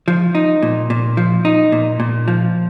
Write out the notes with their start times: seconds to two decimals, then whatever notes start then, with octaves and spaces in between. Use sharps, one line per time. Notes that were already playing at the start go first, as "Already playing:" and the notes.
0.08 F3
0.35 D#4
0.62 A#2
0.90 A#2
1.17 F3
1.45 D#4
1.72 A#2
2.00 A#2
2.28 F3